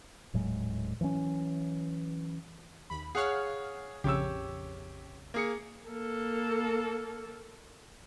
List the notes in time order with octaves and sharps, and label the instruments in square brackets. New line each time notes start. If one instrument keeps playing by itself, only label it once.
[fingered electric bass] D#1 A2 F#3 G#3
E3 F#3 C4 C#4
[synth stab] D#2 B5
[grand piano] G#4 C#5 [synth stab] F5 F#5 F6
[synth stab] A#1 F2 C#3 [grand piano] G4 C#5 E6
[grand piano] A#3 G#4 C#7
[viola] A#3 A4